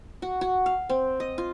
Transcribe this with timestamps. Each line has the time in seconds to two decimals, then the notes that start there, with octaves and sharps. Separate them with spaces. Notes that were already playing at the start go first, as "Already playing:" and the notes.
0.22 F#4
0.41 F#4
0.66 F5
0.89 C4
1.20 D#5
1.38 F4